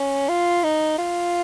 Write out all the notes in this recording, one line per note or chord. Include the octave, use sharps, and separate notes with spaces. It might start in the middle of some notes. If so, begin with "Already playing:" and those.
Already playing: C#4
F4
D#4
F4